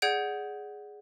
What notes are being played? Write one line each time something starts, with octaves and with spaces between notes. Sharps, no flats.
G#4 D5 F#5 G6 G#6 D7